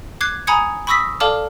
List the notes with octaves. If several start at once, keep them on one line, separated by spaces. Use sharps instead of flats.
D6 F#6 G#6 C7
G#5 A#5 B5 D#6 G#6 C#7
B5 C#6 D#6 E6 A#6 B6
A4 D5 F5 A5 D6 F6